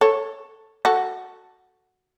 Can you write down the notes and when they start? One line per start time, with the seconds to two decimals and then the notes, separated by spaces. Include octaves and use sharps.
0.01 A4 C#5
0.85 F#4 A4